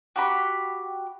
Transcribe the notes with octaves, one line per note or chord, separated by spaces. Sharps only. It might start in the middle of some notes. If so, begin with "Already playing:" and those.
F#4 G4 B5